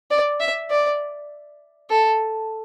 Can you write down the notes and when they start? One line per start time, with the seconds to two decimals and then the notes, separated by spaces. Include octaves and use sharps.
0.11 D5
0.40 E5
0.70 D5
1.90 A4